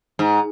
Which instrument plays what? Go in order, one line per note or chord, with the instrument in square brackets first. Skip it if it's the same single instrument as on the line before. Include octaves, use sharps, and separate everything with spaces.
[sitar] G#2